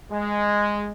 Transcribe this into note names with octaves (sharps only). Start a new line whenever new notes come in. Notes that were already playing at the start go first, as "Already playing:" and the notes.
G#3